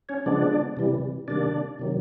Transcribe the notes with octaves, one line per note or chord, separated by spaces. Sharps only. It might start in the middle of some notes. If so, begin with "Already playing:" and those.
C#4 C#5
C#3 F3 G#3 B3 D4 D5
C3 E3 G3
C3 D#3 G3 A#3 D4 D5
C3 D#3 F#3